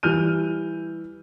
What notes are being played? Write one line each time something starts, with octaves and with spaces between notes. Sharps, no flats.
E3 G3 F6 G6 D#7